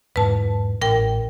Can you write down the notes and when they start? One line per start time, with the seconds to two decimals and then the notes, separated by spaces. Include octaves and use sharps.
0.16 E1 G#2 B4 A5
0.82 A1 A#4 G5